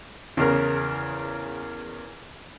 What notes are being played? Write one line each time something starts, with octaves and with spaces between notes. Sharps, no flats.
E2 C#3 A#4